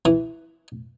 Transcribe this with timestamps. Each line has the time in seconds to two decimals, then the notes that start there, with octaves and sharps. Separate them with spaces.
0.05 E3